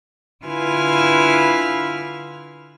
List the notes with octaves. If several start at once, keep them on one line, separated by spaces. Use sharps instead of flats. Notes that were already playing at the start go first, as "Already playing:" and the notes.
D3 E4 F4 B4 G#5 F6